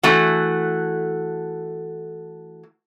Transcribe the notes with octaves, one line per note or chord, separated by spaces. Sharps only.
E3 A3 F#4